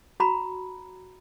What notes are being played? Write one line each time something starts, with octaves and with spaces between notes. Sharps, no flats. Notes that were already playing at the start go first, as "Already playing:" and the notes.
F#4 A#5 B5